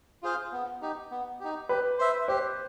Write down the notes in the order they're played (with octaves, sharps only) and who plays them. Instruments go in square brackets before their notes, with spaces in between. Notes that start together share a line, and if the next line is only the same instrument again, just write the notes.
[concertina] F4 G#4 C5 F5
B3
D#4 G4
B3
D#4 G4
[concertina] G4 [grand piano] B4
[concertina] C5 E5
[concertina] G4 [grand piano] C5